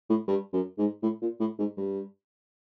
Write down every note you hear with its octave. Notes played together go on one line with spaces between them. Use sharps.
A2
G2
F#2
G#2
A2
A#2
A2
G#2
G2